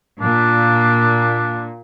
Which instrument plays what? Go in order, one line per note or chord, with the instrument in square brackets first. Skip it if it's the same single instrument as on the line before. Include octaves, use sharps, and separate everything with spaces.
[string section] A#2 [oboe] D4